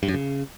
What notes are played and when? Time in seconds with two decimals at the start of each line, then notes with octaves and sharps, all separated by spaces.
0.03 G2
0.08 F#2
0.14 C#3